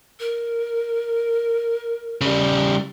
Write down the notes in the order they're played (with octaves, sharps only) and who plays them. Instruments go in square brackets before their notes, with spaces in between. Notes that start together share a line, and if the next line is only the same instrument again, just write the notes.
[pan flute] A#4
[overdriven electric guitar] C#3 G3